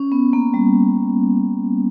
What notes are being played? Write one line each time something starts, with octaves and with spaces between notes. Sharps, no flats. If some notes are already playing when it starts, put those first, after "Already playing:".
Already playing: C#4
B3
A#3
G3